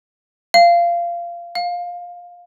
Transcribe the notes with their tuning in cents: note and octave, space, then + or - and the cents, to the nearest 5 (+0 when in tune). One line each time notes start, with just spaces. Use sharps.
F5 -20
F5 +15